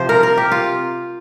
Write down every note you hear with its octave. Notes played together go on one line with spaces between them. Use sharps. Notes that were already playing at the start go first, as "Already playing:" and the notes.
Already playing: C3 F3 C5
A#4
A#4
G4
F4